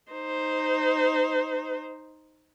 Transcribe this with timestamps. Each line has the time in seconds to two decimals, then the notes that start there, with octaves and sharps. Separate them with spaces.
0.12 D#4 C5